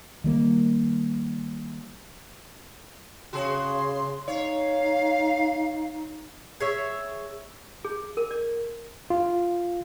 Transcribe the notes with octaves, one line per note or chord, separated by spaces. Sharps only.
D#3 G3 A#3
C#3 F#4 G#4 C6
D#4 C#5 F5
G#4 C#5 E5
G#4
A#4
D5
F4